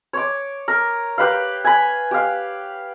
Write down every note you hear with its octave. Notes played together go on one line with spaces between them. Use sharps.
C#5 D6
A#4
G4 B4 F5
G#5 B5
G4 F5